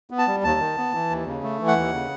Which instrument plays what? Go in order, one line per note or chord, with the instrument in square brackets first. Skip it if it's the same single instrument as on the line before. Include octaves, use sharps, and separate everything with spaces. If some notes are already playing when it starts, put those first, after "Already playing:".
[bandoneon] B3
A5
G3
D#2 A5
D#3
B3
E3
D#2
C#3
A3
E3
F#5
D#2
C#3